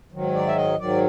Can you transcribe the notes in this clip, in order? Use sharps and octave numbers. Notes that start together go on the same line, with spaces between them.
G#2 D#3 F#3
D5
E5
D#5
G#2 D#3 F#3 D5